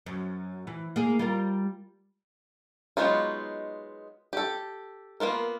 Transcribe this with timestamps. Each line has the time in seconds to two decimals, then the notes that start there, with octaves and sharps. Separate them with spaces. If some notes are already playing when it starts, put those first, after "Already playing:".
0.06 F#2
0.67 E3
0.96 A#3 G#4
1.19 G3 F4 A#4
2.97 F#3 G#3 B3 D#4 F4
4.33 G4 A4
5.20 A#3 B3 F4 A#4